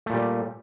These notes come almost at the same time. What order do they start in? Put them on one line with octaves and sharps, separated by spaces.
A3 A#2 G3